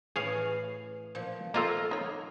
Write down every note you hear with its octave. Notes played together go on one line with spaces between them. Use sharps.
A2 E3 G#4 C#5 F5
A#2 F3
A#3 F4 A4 C5 D#5 A5 A#5
D#4 C#5